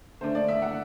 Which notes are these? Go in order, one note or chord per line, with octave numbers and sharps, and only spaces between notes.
D3 A3 D4 C5
D5
E5
F#5